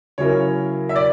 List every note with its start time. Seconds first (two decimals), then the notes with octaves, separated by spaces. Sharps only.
0.18 C#3 F#3 C#4 E4 A#4 C#5
0.89 E5
0.96 D5